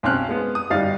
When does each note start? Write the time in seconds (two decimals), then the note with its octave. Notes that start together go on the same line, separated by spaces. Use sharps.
0.03 B1 C4 C#4 F6 F#6
0.29 G#3 B3
0.55 D#6
0.70 G1 G3 D#4 F5 A6